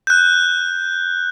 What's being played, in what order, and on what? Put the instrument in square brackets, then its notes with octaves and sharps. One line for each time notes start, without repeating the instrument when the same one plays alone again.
[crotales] F#6 G6